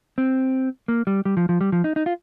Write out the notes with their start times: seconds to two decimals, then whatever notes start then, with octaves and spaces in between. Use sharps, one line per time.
0.18 C4
0.88 A#3
1.07 G3
1.25 G3
1.37 F3
1.49 F3
1.61 G3
1.72 F3
1.84 D#4
1.96 D#4
2.06 F4